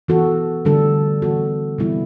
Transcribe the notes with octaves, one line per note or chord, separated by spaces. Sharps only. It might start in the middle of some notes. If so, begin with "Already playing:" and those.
E3 B3 F#4 A4
D3 G3 D4 A4
E3 B3 F#4 A4
C3 E3 G3 B3 E4